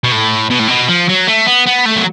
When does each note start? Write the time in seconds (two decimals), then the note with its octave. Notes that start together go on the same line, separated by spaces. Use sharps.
0.04 B2
0.12 A2
0.50 B2
0.59 A2
0.68 B2
0.88 F3
1.09 F#3
1.27 A3
1.46 B3
1.66 B3
1.85 A3
1.96 F#3